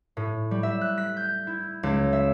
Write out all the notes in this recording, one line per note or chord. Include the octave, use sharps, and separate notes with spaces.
A2
G3
E5
F#6
B6
G6
E4
C#2
E5